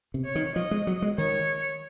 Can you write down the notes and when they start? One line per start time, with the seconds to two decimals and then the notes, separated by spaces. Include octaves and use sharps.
0.14 C3
0.25 C#5
0.35 D#3
0.55 F3 D#5
0.71 G#3
0.87 F#3
1.02 G#3
1.18 D#3 C#5